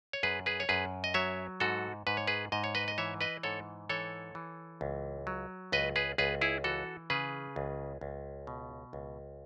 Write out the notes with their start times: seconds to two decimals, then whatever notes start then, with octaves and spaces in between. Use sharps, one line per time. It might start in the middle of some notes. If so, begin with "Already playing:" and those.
0.13 C#5
0.23 F#2 G#4 B4
0.46 G#4 B4
0.60 C#5
0.69 F#2 G#4 B4
1.04 D#5
1.14 F#3 C#5 E5
1.60 G#2 F#4 A4
2.07 G#2 B4
2.17 C#5
2.27 G#4 B4
2.52 G#2 D#5
2.64 C#5
2.75 B4 D#5
2.88 D#5
2.98 E3 C#5 E5
3.21 B4 D#5
3.43 G#2 A4 C#5
3.89 E3 A4 C#5
4.35 E3
4.81 C#2
5.27 F#3
5.72 C#2 B4 D#5
5.96 G#4 B4
6.18 C#2 G#4 B4
6.41 E4 G#4
6.64 E3 F#4 A4
7.10 C#3 G#4 B4
7.56 C#2
8.01 C#2
8.47 B2
8.93 C#2